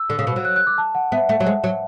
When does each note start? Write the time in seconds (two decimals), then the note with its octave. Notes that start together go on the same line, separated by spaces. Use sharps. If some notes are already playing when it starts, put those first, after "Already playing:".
Already playing: E6
0.10 D3
0.19 C#3
0.27 B2
0.36 F#3
0.45 F#6
0.56 F#6
0.67 D6
0.78 A5
0.95 F#5
1.12 B3 E5
1.29 A3
1.40 F#3
1.46 G#3
1.64 F#3